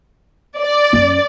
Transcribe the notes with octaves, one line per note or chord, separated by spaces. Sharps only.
D5
F#2 C#4